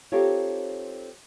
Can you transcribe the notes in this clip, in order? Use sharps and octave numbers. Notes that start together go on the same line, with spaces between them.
C4 D#4 F4 G4 A4 C#5